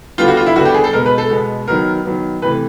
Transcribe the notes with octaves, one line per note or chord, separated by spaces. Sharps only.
D3 G3 B3 F4
F#4
F4
E4
D3 G3 B3 F#4
G4
G#4
A4
B2 G#3 B3 A#4
B4
A4
B2 G#3 B3
D#3 F#3 B3 A#4
D#3 F#3 B3
C3 E3 A3 B4